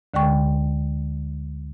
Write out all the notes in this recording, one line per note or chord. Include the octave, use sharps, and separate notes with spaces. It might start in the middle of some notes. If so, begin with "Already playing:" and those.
D2 D3 G#3 G5 C#6